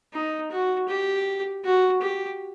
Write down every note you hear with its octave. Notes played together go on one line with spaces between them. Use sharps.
D#4
F#4
G4
F#4
G4